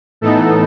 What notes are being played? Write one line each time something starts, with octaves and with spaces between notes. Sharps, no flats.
A2 E3 B3 D#4 A4